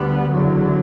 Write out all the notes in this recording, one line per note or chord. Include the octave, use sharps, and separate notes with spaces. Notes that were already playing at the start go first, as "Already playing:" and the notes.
Already playing: D2 D3 G3 B3
F#1 E2 D3 F#3